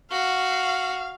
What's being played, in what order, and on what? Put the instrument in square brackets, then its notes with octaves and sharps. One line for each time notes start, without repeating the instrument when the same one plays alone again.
[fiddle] F#4 [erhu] F5